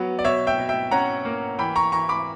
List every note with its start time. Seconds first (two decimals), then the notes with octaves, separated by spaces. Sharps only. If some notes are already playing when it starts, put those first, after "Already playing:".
Already playing: F#3 B3
0.19 D5
0.24 B2 C#5 E5
0.47 E5 G5
0.58 B2
0.69 E5 G5
0.91 C#4 F#5 A#5
1.25 A#3
1.59 E3 G5 B5
1.76 A#5 C#6
1.92 E3 A#5 C#6
2.09 B5 D6